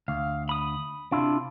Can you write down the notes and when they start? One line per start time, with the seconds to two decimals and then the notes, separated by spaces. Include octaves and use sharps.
0.08 D2 F5
0.49 B5 D#6
1.12 C3 D4 E4 F4